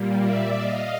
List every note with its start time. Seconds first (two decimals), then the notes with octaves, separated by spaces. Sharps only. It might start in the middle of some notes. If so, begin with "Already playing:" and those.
Already playing: A#2 G3 A#3
0.21 D5 E5
0.56 D#5 F5